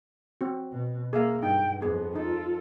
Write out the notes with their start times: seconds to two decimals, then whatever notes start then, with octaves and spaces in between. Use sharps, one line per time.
0.41 C4 F#4
0.71 B2
1.13 A#3 G#4 E5 F5
1.43 G2 D#4 G5
1.82 F2 B3 G#4
2.15 D#4 F4 A4